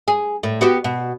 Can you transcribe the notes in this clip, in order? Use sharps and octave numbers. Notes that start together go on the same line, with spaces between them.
G#4
A2
B3 F#4 G4
B2